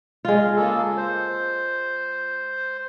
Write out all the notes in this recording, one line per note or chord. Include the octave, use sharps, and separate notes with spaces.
G#3 F4
C#3 A#3 A4
C5